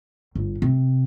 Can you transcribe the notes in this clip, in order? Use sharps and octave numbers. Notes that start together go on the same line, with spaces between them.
G1
C3